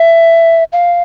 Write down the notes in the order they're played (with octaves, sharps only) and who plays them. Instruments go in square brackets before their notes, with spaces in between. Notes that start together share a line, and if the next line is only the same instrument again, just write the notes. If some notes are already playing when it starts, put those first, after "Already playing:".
Already playing: [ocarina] E5
F5